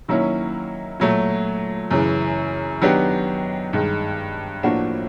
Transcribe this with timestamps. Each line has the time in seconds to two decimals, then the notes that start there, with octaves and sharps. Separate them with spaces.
0.08 D#3 F#3 A#3 C#4 E4
1.00 A#2 F#3 A3
1.91 F#2 C#3 E3
2.81 D#3 F#3 B3 D4 G4
3.73 G2 D#3 G#3
4.63 A2 F3 A#3 D4 F#4